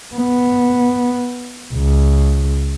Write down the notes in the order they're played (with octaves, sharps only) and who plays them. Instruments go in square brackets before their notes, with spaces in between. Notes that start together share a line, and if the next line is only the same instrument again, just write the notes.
[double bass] B3
C#2